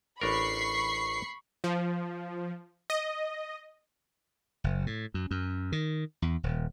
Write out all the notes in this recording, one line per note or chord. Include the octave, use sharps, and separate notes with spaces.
A1 D4 A#4 B5 C#6 C7
F3
D#5
F#1
A2
F#2
F#2
D#3
E2
D#1